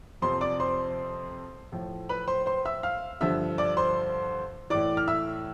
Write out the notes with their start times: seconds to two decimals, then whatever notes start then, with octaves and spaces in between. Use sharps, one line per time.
0.22 F2 C3 F3 C5 C6
0.41 D5 D6
0.60 C5 C6
1.72 A2 F3
2.09 B4 B5
2.27 C5 C6
2.46 C5 C6
2.65 E5 E6
2.83 F5 F6
3.21 G2 D3 F3 E5 E6
3.58 D5 D6
3.77 C5 C6
4.70 A2 E3 D5 D6
4.97 F6
5.08 E5 E6